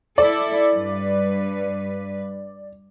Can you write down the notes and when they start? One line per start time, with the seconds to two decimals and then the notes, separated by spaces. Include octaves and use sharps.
0.18 E4 A4 D5
0.76 G2 B4